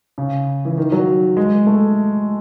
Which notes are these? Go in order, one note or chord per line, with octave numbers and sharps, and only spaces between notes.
C#3
E3
D#3
F#3
G#3
A3